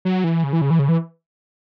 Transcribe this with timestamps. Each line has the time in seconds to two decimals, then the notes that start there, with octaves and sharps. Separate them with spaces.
0.05 F#3
0.24 E3
0.44 C#3
0.53 E3
0.61 C#3
0.70 E3
0.79 C#3
0.89 E3